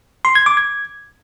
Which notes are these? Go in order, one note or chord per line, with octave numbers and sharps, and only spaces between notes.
C6
G#6
D6
G#6